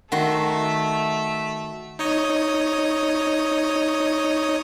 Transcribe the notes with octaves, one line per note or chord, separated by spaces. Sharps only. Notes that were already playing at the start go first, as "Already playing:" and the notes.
D#3 A3 F#4 E5 C6
D#4 C#5 D#5